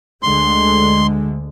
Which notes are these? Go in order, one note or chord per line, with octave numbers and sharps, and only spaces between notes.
D2 D3 G#3 C6